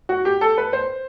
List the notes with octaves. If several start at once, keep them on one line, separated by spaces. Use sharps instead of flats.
F#4
G4
A4
B4
C5